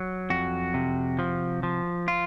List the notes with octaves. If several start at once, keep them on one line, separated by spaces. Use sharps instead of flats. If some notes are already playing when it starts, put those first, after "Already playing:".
Already playing: F#3
F2 F#4
C3
F3
F3
F4